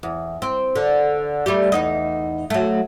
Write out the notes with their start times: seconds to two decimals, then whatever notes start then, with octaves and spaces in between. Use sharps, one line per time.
0.03 E2
0.42 C4
0.76 D3
1.46 G3 A3 G4
1.72 E2 D#4 D#5
2.50 F#3 A3